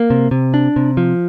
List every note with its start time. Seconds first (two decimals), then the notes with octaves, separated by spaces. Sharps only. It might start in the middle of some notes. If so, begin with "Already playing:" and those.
Already playing: A#3
0.10 C3
0.31 C3
0.54 D4
0.76 C3
0.97 F3